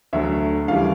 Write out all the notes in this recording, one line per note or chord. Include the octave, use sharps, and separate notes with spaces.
D2 D3 F#3 A3 E5
D#2 C#3 E3 G3 F5